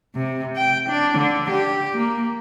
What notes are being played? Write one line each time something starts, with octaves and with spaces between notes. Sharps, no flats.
C3
G5
D4
D3
G4
A#3